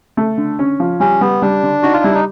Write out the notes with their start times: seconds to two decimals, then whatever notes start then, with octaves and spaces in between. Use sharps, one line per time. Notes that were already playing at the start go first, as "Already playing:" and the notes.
0.17 A3
0.38 D3
0.59 C#4
0.80 F3
1.00 G3 C#4
1.21 G3 B3
1.42 G3 D4
1.63 D3
1.83 D#4 F#4
1.93 F4
2.04 G3 E4
2.14 D#4